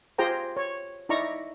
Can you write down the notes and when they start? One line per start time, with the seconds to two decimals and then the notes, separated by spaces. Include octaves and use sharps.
0.18 F4 G4 G#4 C5 G5 A#5
0.57 C#5
1.09 D#4 E4 D5 A#5 C#6